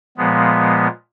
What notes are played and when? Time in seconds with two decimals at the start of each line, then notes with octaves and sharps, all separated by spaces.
0.17 A#2 F3 G#3 B3